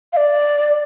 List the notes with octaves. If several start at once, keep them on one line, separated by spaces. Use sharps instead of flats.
F5
D5